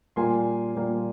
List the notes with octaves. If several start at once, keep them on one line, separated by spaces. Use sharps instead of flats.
A#2 G3 A#3 G#5 C6
A#2 G3 A#3